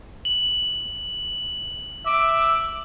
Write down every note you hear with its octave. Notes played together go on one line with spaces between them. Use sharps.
F#7
E5 D6